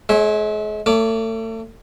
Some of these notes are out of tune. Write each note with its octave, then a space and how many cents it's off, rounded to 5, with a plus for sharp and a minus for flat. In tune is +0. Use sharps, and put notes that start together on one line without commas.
G#3 +40 C#5 -10 E5 -20
A3 +35 C#5 +40 D6 +0